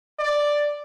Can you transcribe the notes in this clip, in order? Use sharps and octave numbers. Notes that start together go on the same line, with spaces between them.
D5